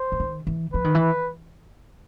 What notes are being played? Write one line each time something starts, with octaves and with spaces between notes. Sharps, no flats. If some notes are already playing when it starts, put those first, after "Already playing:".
Already playing: C5
E3
D#3
E3
F3 B4
D#3
E3